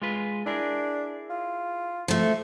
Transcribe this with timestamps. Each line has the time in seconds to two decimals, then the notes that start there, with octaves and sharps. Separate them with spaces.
0.02 G#3 F4 B4
0.46 D4 E4 G#4 A#4
1.30 F4
2.08 F3 A3